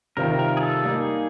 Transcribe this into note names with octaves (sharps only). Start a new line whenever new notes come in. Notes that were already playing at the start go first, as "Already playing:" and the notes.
C3 D#3 G3 C4 F4 A#4
A#4
G#4
A4
G3 A#3 D#4 G#4